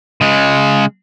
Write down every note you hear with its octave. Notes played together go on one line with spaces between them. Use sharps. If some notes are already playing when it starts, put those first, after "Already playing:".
C#3 G#3